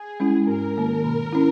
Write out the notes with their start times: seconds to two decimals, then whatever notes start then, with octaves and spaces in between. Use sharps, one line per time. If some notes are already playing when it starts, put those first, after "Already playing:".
Already playing: G#4
0.20 G#3 C#4 E4
0.48 G#2 A#4
0.77 D#3 A#3
1.04 B2
1.33 C#4 E4